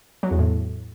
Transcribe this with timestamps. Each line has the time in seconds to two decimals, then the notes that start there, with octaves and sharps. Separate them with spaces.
0.23 F#3
0.31 E2
0.39 A2